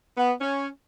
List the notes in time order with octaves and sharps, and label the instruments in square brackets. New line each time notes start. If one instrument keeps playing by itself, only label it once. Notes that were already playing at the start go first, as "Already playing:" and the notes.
[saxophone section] B3
C#4